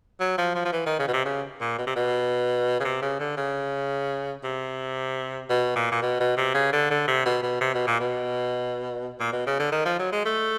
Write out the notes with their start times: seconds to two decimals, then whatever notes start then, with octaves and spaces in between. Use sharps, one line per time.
0.20 F#3
0.38 F3
0.55 F3
0.65 F3
0.72 E3
0.86 D#3
0.99 C#3
1.08 B2
1.13 C3
1.25 C#3
1.61 A#2
1.78 B2
1.87 C3
1.96 B2
2.80 C#3
2.84 C3
3.02 C#3
3.19 D3
3.37 C#3
4.44 C3
5.49 B2
5.76 A#2
5.92 A#2
6.02 B2
6.20 B2
6.37 C3
6.54 C#3
6.72 D3
6.90 D3
7.07 C3
7.26 B2
7.42 B2
7.61 C3
7.74 B2
7.87 A#2
8.00 B2
9.20 A#2
9.32 B2
9.46 C#3
9.59 D3
9.72 D#3
9.85 F3
9.99 F#3
10.12 G#3
10.25 A3